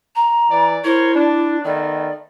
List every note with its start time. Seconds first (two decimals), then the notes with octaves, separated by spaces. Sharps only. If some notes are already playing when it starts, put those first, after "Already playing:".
0.16 A#5
0.51 E3 D5
0.84 E4 A#4 C5 C#5
1.15 D4
1.64 D#3 A3 B3 D5